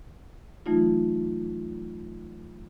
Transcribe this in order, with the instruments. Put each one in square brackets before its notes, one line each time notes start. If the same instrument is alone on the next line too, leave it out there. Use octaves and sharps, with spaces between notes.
[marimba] E3 F#3 A3 D#4 F4